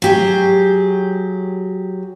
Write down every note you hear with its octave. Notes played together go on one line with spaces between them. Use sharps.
F#3 G4 G#4